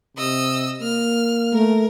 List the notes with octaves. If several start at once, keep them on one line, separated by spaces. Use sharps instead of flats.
C3 D#5 E6
A#3 F6
A3 A#4